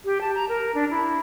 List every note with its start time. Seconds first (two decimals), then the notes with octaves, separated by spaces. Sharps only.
0.05 G4
0.21 A5
0.35 A#5
0.49 A#4
0.75 D4
0.91 E4